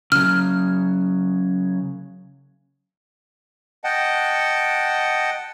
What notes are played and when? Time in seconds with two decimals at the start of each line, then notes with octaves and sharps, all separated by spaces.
0.12 C#3 F#3 F6
3.84 D#5 F#5 G5 A5